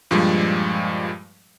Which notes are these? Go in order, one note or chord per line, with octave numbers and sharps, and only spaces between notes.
G2 A#2 F3 G3 G#3